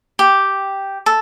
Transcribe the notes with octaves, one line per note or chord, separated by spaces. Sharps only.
G4
A4